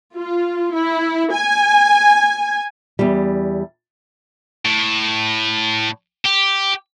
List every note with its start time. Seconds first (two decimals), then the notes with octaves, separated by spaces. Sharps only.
0.16 F4
0.75 E4
1.33 G#5
2.99 E2 G3
4.65 A2
6.25 G4